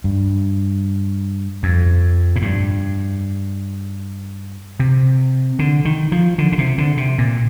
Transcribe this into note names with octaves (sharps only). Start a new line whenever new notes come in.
G2
F2
G#2
G2
C3
D3
D#3
F3
D3
D3
C3
D3
C3
A#2